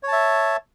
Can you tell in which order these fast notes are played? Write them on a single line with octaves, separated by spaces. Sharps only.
C#5 A5 E5